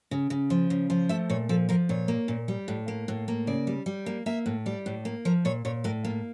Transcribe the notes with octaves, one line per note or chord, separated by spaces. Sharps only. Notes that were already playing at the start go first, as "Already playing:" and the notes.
C#3
C#3
F3
C#3
F3
A3 E5
A#2 C#5
F3 A4
F3 A#4
A#2 C#5
A#3
A#2
G3
A2
A#3
A2
A#3
C#3 D5
G3
G3
A#3
A#3 E5
A2
G3 D5
A2
A#3
F3 A#4
A#2 C#5
A#2 C#5
A2 A#4
A#3 F4